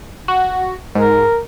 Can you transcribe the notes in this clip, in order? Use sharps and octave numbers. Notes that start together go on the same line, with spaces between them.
F#4
G#2 A#4